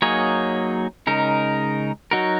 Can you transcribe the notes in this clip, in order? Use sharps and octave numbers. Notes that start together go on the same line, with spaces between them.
F#3 A#3 D#4 G#4 C#5
C#3 G#3 D#4 A#4
F#3 D#4 F#4 A#4